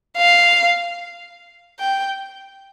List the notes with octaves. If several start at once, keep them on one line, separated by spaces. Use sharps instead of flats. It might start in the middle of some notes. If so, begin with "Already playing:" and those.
F5
G5